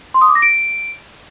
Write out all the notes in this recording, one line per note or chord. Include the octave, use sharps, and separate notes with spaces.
C6
D#6
D6
A#6
D7